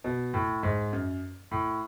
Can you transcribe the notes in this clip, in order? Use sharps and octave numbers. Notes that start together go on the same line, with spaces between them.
B2
A2
G#2
F#2
A2